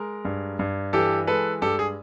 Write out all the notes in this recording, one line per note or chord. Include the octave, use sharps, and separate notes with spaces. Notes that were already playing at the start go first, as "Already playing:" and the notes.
Already playing: G#3 A#4
G2
G2
E3 G4 A4
G#3 A4 B4
G2 G4 A4
G#4